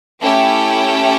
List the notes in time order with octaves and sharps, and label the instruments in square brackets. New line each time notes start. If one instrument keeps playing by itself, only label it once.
[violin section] A3 C#4 E4 G4 G5